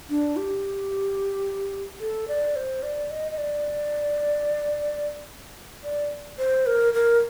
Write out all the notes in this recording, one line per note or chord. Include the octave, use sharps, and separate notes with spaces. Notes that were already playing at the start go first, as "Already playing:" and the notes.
D4
G4
A4
D5
C5
D5
D#5
D#5
D5
D5
C5
A#4
A#4